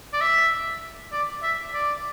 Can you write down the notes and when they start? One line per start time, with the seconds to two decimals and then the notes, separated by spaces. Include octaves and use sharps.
0.13 D5
0.21 E5
1.12 D5
1.43 E5
1.74 D5